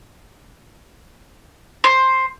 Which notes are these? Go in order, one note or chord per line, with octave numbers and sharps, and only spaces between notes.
C5